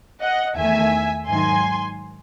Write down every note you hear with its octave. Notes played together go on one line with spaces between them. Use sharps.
D#5 F#5
E2 D#3 A3 E5 G#5
G#2 D#3 F#3 G#5 C6